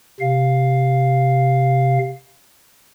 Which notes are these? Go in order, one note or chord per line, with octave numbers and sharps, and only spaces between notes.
C3 F5